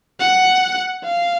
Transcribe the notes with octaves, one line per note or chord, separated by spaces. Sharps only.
F#5
F5